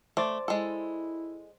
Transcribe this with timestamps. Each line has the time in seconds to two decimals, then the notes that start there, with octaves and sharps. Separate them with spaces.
0.17 A3 C5 D5 A6
0.48 G#3 E4 A4